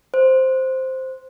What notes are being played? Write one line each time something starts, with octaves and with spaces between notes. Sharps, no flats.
C5